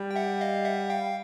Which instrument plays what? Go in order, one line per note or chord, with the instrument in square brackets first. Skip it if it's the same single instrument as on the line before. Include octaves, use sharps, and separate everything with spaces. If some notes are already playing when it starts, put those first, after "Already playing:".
Already playing: [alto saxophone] G3
[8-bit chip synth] G5
E5 F#5
D#5 F5
E5 F#5
F5 G5